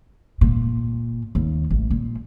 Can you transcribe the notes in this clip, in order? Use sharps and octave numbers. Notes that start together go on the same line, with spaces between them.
A#2
D#2
A1
A#2